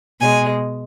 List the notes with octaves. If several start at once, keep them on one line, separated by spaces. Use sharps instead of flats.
B2 G#3 G#5